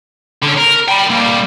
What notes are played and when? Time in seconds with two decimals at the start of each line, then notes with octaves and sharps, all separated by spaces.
0.43 D3 C#4
0.58 A#4
0.88 G5 B5
1.10 G3 A#3